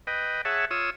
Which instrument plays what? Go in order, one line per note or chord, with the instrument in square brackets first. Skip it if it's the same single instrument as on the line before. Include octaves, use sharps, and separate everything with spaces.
[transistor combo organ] B4 D#5 G5
G#4 C#5 E5 F#5 A5
F4 C#5 D#6 E6